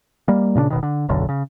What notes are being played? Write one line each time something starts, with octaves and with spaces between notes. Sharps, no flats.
G3 A#3
A#2 C#3 C#4 D4
E1 B2 D#3
D3
D#1 B1 F#2 D3
C#3